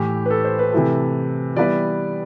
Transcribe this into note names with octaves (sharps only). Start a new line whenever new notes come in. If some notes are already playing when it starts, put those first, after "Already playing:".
Already playing: A2 E3 A3 G4
B4
A4
C5
B4
C3 E3 A3 E4 A4
E3 G3 B3 E4 B4 D5